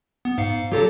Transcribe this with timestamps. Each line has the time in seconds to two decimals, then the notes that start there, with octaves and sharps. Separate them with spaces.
0.25 B3
0.38 G#2 F5 C#7
0.72 F#3 G4 A4 A#5